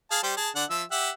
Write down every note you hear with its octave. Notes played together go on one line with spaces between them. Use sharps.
G#4 F5 A5
G3 G4 C5
G#4 A5
D3 D4 F#5
F3 E5 E6
G4 E5 F#5